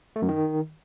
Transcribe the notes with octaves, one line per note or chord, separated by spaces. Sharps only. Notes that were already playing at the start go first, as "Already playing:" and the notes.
A3
F#2
D#3